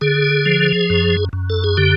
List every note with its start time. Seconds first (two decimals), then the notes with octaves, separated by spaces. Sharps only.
0.01 D3 G#4
0.46 F3
0.90 F#2
1.33 F#2
1.50 A4
1.64 G#4
1.77 D3 G4